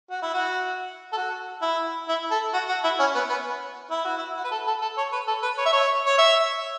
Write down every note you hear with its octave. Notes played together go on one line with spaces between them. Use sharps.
F#4
E4
F#4
A4
F#4
E4
E4
A4
F#4
F#4
E4
C#4
B3
B3
E4
F#4
E4
F#4
B4
A4
A4
A4
C#5
B4
A4
B4
C#5
E5
C#5
C#5
E5